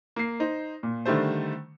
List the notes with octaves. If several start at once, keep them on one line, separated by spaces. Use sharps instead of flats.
A#3 C7
D#4 C5
A#2
D3 D#3 G3 A3 C5